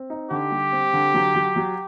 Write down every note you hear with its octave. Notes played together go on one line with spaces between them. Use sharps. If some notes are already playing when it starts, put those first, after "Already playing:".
Already playing: C4
D#4
D3 G4
G3
C4
D3
F#3
F#3
F#3